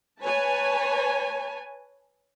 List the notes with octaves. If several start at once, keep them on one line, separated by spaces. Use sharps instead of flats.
B4 C#5 G#5 A5